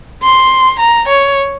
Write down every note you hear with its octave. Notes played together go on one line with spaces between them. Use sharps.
C6
A#5
C#5